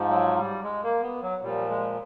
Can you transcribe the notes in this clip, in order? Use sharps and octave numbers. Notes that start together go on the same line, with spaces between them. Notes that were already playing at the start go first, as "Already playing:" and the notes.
Already playing: G#2 F3
F#3
G3
G#3
A#3
B3
F#3
A#2 F3 G3
G#3